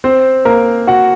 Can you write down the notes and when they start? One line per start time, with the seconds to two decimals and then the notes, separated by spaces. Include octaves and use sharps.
0.04 C4 C5
0.45 A#3 A#4
0.87 F#4 F#5